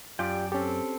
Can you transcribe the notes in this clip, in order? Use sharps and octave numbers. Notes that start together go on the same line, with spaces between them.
F#2 F4 G4 D5 G5
C4 C#4 G4 A4